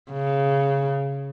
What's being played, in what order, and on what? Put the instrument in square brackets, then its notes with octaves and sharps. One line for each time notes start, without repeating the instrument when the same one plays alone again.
[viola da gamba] C#3